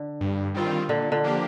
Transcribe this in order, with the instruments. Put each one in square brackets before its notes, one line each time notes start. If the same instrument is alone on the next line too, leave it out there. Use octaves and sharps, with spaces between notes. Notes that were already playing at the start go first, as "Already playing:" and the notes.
Already playing: [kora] D3
[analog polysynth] G2
D#3 G3 C4 F4
[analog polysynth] A#2 [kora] D3
[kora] D3
[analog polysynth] F3 A#3 D4 G4